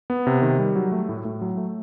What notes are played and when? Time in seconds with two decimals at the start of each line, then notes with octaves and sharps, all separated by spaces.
0.10 B3
0.27 C3
0.42 D#3
0.59 G3
0.75 F#3
0.92 A3
1.09 A2
1.25 A2
1.41 F#3
1.57 A3